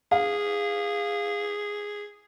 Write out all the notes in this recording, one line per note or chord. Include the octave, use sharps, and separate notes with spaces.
G#4 F5